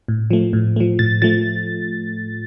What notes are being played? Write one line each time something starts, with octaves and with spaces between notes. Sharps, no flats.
A2
F3 A3
A2
F3 A3
A2 A6
F3 A3 A6